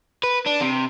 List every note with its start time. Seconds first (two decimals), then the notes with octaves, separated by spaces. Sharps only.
0.23 B4
0.46 D4
0.61 C3